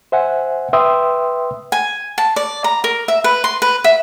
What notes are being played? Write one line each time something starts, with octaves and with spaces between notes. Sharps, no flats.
C5 E5 F#5 G#5
B4 E5 G5 C6 D#6 E6
G#5
A5
D5
A#5
A#4
E5
B4
C6
B4
E5